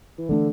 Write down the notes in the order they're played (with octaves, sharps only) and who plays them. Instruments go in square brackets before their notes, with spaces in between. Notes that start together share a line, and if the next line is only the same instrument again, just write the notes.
[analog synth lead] E3
[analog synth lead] D3 [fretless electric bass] E3 A3 D4